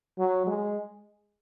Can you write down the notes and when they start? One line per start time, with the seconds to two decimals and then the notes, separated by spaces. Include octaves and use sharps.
0.18 F#3
0.47 G#3